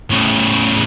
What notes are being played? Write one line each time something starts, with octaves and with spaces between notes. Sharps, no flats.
A2 C#3